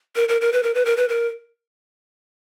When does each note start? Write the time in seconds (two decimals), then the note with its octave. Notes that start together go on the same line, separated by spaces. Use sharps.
0.16 A#4
0.29 A#4
0.41 A#4
0.53 B4
0.63 A#4
0.75 B4
0.85 A#4
0.97 B4
1.09 A#4